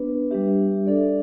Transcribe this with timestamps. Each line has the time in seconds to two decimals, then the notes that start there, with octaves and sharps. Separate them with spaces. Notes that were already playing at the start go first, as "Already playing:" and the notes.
Already playing: B3 D4 B4
0.31 G3 D4 G4 E5
0.87 D4 A4 D5